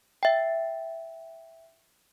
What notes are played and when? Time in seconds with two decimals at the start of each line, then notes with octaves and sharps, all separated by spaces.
0.23 E5 G5